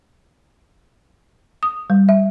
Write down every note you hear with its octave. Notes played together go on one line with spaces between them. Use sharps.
D#6
G3
E5